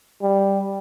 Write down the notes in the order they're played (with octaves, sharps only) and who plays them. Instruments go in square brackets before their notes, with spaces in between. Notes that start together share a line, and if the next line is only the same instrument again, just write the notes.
[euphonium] G3